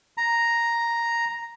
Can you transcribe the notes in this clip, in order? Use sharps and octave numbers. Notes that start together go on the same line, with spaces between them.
A#5